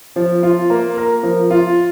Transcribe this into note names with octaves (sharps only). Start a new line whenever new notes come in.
F3
F4
A#3
A#4
F3
F4